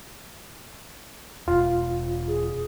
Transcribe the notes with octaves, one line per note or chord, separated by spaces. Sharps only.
E1 F4
G#4